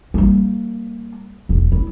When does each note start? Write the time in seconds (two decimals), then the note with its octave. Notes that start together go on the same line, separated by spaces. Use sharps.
0.14 G3 A#3
1.49 E1
1.72 E4